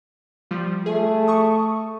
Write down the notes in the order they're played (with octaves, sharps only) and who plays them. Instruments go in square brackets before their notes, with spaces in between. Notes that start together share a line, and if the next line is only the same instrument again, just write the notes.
[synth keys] F3 G3 F4
[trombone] A3 [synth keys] G#4
[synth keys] C#6 D#6